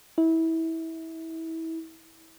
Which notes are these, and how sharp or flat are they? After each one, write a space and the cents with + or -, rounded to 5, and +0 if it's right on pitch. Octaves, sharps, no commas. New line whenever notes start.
E4 -25